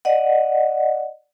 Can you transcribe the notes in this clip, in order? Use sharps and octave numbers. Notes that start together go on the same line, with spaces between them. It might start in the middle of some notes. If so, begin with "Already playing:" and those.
D5 D#5 F#5